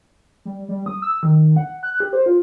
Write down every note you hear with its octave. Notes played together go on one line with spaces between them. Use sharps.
G3
G3
D#6
E6
D#3
F#5
F#6
G4
C5
F4